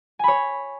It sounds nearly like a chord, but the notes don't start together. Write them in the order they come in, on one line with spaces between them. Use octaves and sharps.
G#5 B5 C#5